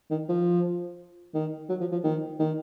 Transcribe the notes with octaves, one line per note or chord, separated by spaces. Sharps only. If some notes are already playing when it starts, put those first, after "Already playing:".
D#3
F3
D#3
F#3
F3
F3
D#3
D#3